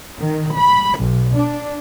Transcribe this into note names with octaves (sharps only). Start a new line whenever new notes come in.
D#3
B5
B1
D4